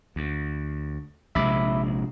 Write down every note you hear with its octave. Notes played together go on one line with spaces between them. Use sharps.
D2
A#1 C3 G#3 E5 B5 D6